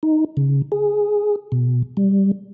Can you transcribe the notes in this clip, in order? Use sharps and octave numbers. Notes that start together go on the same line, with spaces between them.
D#4
C#3
G#4
B2
G3